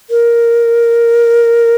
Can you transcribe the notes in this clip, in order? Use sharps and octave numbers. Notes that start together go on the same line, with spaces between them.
A#4